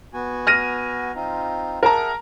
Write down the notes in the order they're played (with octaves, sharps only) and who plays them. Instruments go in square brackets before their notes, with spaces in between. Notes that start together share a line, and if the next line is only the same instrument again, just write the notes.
[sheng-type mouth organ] B3 F#4 G#5
[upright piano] F6 A#6 D#7
[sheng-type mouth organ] C4 D#4 F4
[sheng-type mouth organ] G#4 E5 F#5 [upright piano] A#4 A5 A#5